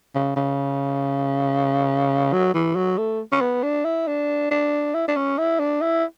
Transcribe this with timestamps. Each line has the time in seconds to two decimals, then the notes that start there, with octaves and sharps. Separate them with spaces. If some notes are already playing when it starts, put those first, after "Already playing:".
0.15 C#3
0.36 C#3
2.33 F#3
2.54 E3
2.76 F#3
2.98 A3
3.32 C#4
3.41 B3
3.63 D4
3.85 E4
4.08 D4
4.51 D4
4.95 E4
5.08 D4
5.16 C#4
5.38 E4
5.59 D4
5.82 E4